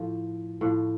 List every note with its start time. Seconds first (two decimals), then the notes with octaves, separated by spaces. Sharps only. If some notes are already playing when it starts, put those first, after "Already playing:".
Already playing: A2 F3
0.61 A2 F3